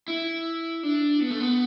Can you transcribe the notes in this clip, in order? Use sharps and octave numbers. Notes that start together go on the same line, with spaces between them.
E4
D4
B3
A3
B3